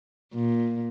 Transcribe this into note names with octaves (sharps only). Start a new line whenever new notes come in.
A#2